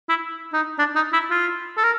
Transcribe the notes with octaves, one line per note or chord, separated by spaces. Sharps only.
E4
D#4
D4
D#4
E4
F4
A4
A#4